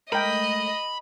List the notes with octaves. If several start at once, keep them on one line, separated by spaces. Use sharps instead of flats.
G#3 A3 A#4 D#5 G5 B5